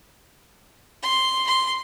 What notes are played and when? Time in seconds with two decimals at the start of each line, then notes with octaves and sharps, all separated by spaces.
1.02 C6
1.47 C6